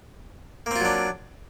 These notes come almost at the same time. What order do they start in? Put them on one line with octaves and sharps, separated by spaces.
A#3 C4 F4 F#3 D4